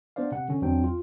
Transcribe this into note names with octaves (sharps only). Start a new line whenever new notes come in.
B3 D4 C5 D5 F5
C3 F#5
D3 C#4
E2 F#3 C4 D4 G5
F4